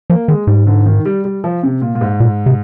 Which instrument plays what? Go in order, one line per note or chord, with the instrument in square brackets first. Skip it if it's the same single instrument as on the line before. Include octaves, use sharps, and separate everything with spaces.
[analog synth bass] F3 [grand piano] A#3
[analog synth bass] D#3 [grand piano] G#3
[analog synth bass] G#2 [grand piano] G3
[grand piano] D3
D#3
G3
G3
F3
C3
A#2
A#2
G#2
[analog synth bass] A#2
C3